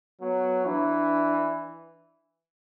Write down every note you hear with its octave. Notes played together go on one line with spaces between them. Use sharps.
F#3 B3
E3 D4